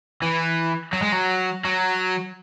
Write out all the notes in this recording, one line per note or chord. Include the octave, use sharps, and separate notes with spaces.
E3
F#3
G#3
F#3
F#3